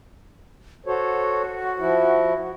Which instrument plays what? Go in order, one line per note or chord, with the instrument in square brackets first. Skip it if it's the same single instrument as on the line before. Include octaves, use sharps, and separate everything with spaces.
[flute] F#4 [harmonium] A4 C5 C#5
[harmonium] F3 E4